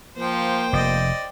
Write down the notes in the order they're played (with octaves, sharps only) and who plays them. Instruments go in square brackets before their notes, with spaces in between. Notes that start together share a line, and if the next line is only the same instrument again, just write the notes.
[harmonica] F3 [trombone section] A#3 [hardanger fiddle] C5 G5
[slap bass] F1 [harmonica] D5 D#5